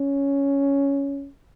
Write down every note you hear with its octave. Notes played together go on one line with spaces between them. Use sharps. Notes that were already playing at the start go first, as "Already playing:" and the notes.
Already playing: C#4